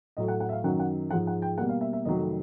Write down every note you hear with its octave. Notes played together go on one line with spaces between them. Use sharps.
A2 F#3 A3 D#5
F#5
F#5
E5
F5
F#2 D#3 F#3 F#5
F#5
G#2 F3 G#3 F#5
F#5
G5
B2 G3 A#3 F#5
F5
E5
E5
F2 C3 D#3 F#3 A3 D#5